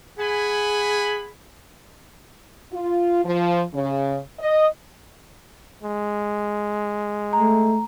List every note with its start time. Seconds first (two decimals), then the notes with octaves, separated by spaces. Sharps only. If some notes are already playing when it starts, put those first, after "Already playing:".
0.19 G#4 F#5 G#5 B5
2.73 F4
3.24 F3
3.73 C#3
4.39 D#5
5.83 G#3
7.33 A3 A#5